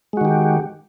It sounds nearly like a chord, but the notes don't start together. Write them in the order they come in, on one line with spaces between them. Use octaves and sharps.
G#3 F#4 D#3 G4